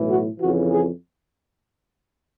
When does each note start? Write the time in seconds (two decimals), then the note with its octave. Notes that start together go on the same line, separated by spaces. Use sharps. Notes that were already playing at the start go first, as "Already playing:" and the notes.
Already playing: B1 A2 E3
0.09 F#4
0.39 F2 C#3 E3 F#4
0.71 G#4